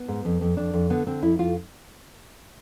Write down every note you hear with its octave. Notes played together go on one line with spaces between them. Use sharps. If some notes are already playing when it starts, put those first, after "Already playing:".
Already playing: B3
G#2
F2
F2
F2 D4
F2
D3 B3
D3 C4
F2 E4
F2 F4